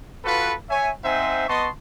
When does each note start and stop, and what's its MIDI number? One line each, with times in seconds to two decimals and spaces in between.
0.25 0.53 65
0.25 0.53 66
0.25 0.53 69
0.25 0.53 71
0.70 0.91 73
0.70 0.91 76
0.70 0.91 80
1.03 1.45 60
1.03 1.45 63
1.03 1.45 72
1.03 1.45 76
1.03 1.45 78
1.03 1.45 80
1.48 1.68 59
1.48 1.68 75
1.48 1.68 81
1.48 1.68 84
1.48 1.68 85